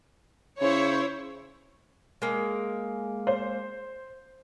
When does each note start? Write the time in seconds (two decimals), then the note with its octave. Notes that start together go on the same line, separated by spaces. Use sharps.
0.61 C#3 E4 C5 C#5
2.22 G#3 A#3
3.27 C5